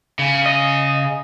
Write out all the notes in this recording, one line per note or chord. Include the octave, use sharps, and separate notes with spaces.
C#3
D#5